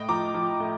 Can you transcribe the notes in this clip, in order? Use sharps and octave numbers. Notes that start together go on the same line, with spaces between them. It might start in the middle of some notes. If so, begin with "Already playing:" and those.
Already playing: A2 D#5 G5
F3 A#5 D6
F3
A2